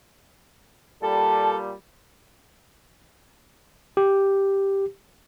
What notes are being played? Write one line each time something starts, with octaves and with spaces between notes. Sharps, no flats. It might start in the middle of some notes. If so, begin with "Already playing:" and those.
A#2 G3 A4 A5
G4